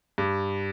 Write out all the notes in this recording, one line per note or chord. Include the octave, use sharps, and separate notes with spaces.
G2